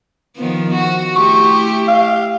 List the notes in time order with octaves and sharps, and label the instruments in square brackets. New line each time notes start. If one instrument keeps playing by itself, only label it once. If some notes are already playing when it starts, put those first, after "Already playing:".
[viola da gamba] D#3 F3 B3
F#4
[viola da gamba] A3 E4 G4 [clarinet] C#6
[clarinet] F5